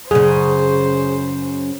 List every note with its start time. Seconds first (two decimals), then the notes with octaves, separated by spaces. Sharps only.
0.11 F#2 C#3 G#4 C5